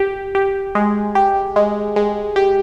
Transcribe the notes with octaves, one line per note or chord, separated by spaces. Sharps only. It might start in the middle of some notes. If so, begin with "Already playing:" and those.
Already playing: G4
G4
G#3
G4
G#3
G#3
G4